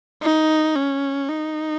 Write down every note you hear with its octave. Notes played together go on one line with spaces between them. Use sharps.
D#4
C#4
D#4